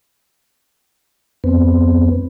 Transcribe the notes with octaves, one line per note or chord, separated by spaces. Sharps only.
F2 B3 C4